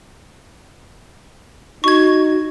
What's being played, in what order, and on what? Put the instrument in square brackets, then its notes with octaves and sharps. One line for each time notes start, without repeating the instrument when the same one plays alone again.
[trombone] D#4 [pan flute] F#4 [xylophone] C#6 G#6